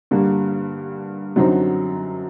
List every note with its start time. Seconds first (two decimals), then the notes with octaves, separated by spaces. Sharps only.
0.11 G2 D3 G3 A#3
1.36 F#2 D3 F#3 C4 D#4